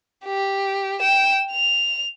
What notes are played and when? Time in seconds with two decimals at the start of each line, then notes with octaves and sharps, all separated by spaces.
0.25 G4
1.01 G5 E7
1.52 F7